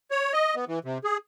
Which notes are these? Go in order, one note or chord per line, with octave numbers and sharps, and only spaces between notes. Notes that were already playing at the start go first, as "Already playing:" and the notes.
C#5
D#5
B3
E3
C3
G#4